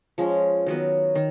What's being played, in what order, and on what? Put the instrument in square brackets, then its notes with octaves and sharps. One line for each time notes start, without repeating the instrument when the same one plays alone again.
[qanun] F3 G#3 C#4
D#3 F#3 B3
D#3